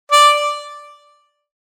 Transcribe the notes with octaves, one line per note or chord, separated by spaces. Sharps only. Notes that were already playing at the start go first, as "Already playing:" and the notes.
D5